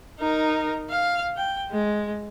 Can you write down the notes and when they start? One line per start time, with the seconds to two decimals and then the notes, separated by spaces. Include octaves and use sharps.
0.19 D#4 A#4
0.90 F5
1.37 G5
1.71 G#3